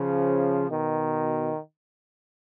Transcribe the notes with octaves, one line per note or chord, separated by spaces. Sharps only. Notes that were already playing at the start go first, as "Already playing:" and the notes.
Already playing: C#3 F3
B2 D#3